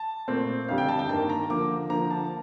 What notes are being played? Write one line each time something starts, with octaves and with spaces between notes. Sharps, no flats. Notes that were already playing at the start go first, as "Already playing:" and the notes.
Already playing: A5
A#2 A3 C4
F2 D3 G3 F5
G5
A5
G5
G2 D#3 A#3 A5
A#5
D3 F3 A#3 D6
D3 F3 A#3 A#5
A5